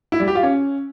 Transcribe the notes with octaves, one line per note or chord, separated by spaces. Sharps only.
E4
G3
G4
F4
C#4